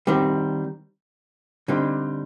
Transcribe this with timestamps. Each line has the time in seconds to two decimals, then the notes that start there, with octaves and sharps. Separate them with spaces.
0.07 D#3 G3 C4
1.68 D3 G3 C4 D#4